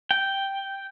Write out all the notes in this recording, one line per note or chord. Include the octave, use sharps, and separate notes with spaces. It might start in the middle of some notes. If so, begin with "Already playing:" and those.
G5